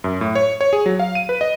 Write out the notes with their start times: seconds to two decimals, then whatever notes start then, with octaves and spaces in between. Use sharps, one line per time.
0.04 F#2
0.21 A2
0.35 C#5
0.61 C#5
0.73 G#4
0.86 F#3
0.99 F5
1.15 D#7
1.29 B4
1.41 D#5